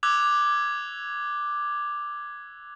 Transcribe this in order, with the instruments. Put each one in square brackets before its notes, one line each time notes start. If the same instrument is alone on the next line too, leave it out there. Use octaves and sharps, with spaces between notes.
[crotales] D6 E6 F#6 G#6 F7